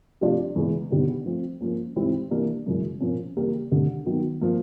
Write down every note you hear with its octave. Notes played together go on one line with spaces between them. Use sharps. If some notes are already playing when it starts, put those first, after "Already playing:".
C3 F3 A3 D4 F4
E2 C#3 E3 G#3 B3
D3 G3 B3 D#4
F3 A3 C4
F3 A#3 C#4
G#2 E3 G3 C4 E4
E3 G3 A#3 D4
F#2 C#3 E3 G#3
A#2 F3 A#3 C#4
C#3 E3 G3 A#3
D2 D3 G3
D#3 F#3 B3
F3 A#3